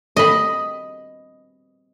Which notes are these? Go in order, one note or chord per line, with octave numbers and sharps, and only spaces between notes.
D#5 B5